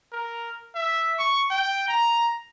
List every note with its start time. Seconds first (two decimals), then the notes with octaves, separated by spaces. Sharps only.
0.12 A#4
0.75 E5
1.19 C#6
1.50 G5
1.88 A#5